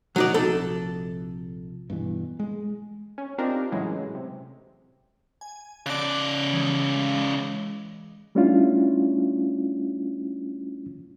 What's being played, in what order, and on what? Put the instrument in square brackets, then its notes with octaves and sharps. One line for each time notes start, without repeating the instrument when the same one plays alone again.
[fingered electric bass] B2 [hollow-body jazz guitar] F#3 D#4 D5
[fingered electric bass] A#1 C3 F3 [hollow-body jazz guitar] A4
[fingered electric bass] G2 B2 E3
G#3
[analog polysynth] C#4
C4 D4 D#4 F4 G4 A#4
A2 C#3 E3 F#3 G#3
C3
[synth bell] G#5
[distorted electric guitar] C#3 D5 [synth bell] A5 F#6
[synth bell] E3 G#3
[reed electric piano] G3 A3 C#4 D4 E4 F4